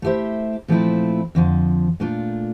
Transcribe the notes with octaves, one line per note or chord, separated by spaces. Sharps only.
A3 E4 G4 C5 E5
A#2 F3 A3 C4 E4
F2 D3 F3
A#2 A3 D4 F4